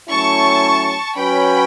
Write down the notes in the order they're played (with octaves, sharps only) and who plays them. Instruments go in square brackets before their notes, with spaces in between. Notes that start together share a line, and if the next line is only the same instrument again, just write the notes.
[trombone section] F#3 A3 C#4 E4 [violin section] A5 C#6
[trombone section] F#3 C#4 F#4 B4 [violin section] G5 B5